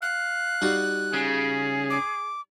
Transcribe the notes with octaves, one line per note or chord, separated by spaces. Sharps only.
F5 F#6
G3 D#4 F#4
C#3 G#4
D6